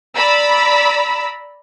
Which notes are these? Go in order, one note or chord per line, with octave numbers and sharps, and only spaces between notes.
D5 A#5 B5 E6